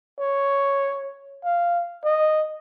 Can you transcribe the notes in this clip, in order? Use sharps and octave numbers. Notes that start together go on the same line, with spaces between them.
C#5
F5
D#5